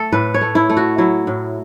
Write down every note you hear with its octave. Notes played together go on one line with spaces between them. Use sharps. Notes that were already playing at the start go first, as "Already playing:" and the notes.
Already playing: A3 A4
A2 B4
C#5
A3
E4
A3
F#4
F#3 E4
A2